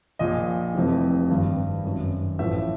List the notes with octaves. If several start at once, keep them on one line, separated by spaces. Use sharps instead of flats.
A#1 A#2 F3 D#5
F1 F2 C3 E3
G#1 G2 D#3
G#1 F#2 D#3
A1 A2 F3 E5